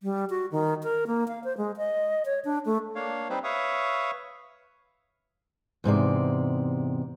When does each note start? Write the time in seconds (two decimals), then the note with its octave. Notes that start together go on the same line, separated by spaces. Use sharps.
0.03 G3
0.30 F#4
0.52 D#3
0.83 A#4
1.07 A#3
1.28 F5
1.44 C5
1.57 G#3
1.77 D#5
2.26 C#5
2.45 D4
2.66 A3
2.95 A#3 D4 C#5 F5
3.29 G3 C4 D#4 B4 C5
3.44 B4 C#5 E5 F5 C#6 D#6
5.84 E2 G#2 C3 D5